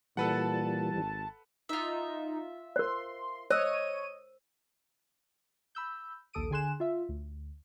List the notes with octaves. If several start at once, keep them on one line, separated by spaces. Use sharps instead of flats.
A#2 E3 G3 A4 B4 F#5 A5
G#1
D#4 F4 E5
A#4 C5 C6
C5 C#5 D#5 E6 D#7
B5 E6 G6
A#1 D#2 A4 D#6 D7 D#7
D3 G#4 G#5 C6 F#6 E7
F4 E5
D2